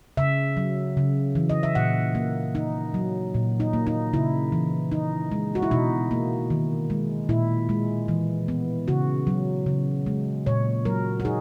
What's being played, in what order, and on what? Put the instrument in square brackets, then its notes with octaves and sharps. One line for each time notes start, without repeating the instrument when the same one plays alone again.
[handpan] C#3 E5
F#3
C#3
E3
D#5
E5
A#2 F#5
A#3
D#4
F#3
A#2
D#4
A#3
D#4
C#3 E4
E3
D#4
G#3
F#4
E4
B2 D#4
A#3
D#3
G#3
A#2 E4
G#3
E3
B3
C#3 F#4
F#3
C#3
G#3
A#2 C#5
F#3 A#4
F#4
D#4 G#4